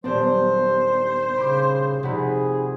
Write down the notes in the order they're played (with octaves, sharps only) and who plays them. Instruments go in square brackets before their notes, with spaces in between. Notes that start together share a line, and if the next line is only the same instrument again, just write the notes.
[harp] D#1 D4 [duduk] F#3 [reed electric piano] B3 G4 [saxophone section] C5
[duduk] C#3 [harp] G5 [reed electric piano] B5 C6 D6
[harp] F1 C3 [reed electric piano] D#4 F#5 B5 [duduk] G#4